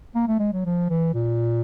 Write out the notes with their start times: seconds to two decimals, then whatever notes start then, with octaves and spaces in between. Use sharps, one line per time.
0.15 A#3
0.28 A3
0.40 G#3
0.53 F#3
0.65 F3
0.90 E3
1.14 A#2